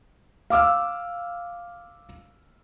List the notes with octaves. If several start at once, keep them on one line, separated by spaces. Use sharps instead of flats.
F5 D6 E6 F6